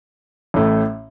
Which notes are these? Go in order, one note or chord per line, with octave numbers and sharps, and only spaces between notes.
A1 A2 A3